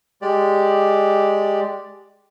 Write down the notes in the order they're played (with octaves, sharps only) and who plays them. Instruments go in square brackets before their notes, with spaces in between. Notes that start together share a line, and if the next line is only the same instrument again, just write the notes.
[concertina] G#3 G4 D5